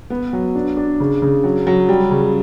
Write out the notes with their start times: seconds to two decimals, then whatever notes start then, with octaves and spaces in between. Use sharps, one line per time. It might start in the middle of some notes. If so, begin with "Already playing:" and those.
0.10 B3
0.33 F#3
0.55 D4
0.77 D4
1.00 C#3
1.22 C#3
1.44 F#3
1.67 F#3
1.89 G3
2.11 C#3